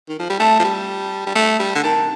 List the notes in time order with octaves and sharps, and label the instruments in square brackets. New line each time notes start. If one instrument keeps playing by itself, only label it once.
[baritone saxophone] D#3
F3
G3
[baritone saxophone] A3 [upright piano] A5
[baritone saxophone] F3
G3
G3
A3
G3
D3
[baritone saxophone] D#3 [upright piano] A5